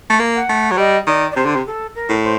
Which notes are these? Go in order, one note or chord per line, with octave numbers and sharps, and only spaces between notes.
A3
A#3
F#5
A3
F#3
G3 D#5
D#3 D5
D5
C3 C5
D3
C3
A4
A#4
A2
C5